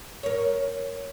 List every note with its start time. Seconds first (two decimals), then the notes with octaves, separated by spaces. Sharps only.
0.23 A#4 C#5